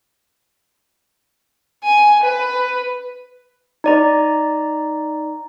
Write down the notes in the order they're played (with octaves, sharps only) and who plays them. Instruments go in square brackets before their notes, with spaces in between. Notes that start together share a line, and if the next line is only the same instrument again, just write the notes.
[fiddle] G#5
B4
[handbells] D#4 D5 A#5